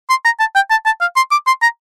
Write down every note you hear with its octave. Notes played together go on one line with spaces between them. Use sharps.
C6
A#5
A5
G5
A5
A5
F5
C6
D6
C6
A#5